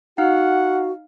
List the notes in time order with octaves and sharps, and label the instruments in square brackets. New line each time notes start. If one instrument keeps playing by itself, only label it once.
[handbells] D#4 F5 F6 [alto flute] F#4 [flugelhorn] F#5